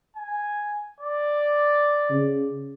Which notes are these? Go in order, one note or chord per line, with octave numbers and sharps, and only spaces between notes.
G#5
D5
C#3